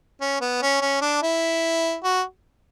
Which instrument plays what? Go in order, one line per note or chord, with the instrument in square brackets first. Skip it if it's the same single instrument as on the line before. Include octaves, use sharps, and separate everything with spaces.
[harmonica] C#4
B3
C#4
C#4
D4
E4
F#4